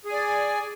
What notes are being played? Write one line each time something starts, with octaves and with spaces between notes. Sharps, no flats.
G#4 D5 G#5